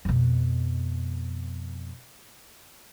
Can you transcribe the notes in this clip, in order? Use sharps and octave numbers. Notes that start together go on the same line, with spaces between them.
F2 B2